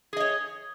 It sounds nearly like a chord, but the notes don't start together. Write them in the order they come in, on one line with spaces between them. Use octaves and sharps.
G#4 D#5 C#5